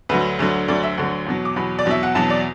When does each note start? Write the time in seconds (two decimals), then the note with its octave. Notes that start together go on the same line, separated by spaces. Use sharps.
0.09 D2 D3 F#3 B4
0.39 D2 D3 F#3
0.68 D2 D3 F#3 D5
0.83 E5
0.97 D2 D3 F#3 F#5
1.27 E2 B2 F#3
1.45 D6
1.56 E2 B2 F#3 B5
1.79 D5
1.86 E2 B2 F#3 E5
2.03 F#5
2.15 E2 B2 F#3 A5
2.30 D5